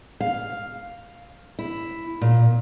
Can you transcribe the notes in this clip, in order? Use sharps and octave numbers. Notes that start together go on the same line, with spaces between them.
F5
E4
A#2